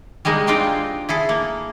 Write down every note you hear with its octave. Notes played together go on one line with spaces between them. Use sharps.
G3 G#3 A#3 D#4
C4 D4 D#4 F4 G5
E4 G#4 A4
A#3